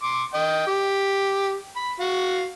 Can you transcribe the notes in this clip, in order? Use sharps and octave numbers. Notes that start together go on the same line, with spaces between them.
C6 D6
D#5 G5
G4
B5
F#4 F5